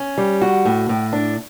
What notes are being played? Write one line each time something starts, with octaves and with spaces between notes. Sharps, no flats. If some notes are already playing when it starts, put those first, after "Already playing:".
Already playing: C#4
G3
F#4
A2
A2
D4